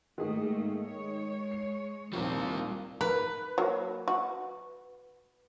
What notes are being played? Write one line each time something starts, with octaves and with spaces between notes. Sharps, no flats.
G#2 D#3 A3 A#3 G#4
G#3 C#5
C7
D#2 A#2 D#3 F3 G3 C4
A#4 B4
F#3 A#3
F#4